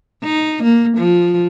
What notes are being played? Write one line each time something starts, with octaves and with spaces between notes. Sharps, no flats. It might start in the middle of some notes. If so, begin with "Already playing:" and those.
D#4
A#3
F3